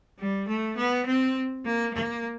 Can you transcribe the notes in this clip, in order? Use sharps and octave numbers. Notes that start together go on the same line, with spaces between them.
G3
A3
B3
C4
A#3
A#3